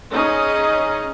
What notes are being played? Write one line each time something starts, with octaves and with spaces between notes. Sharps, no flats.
C#4 D#4 G#4 D#5